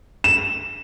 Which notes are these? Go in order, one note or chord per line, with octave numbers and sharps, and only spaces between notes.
E7